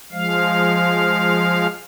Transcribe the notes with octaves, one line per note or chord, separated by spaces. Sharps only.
F3 G#3 F5